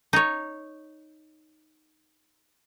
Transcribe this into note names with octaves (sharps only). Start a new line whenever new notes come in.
D#4 C#5